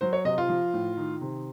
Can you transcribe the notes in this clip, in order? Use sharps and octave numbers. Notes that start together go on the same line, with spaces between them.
F#3 C5
C#5
C3 D#5
F4
F3
A2
D#3
C3